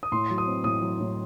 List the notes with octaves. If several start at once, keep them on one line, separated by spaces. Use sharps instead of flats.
D#6
A2 C6
F#3
D#6
C4
A2 D#6
F#3
A2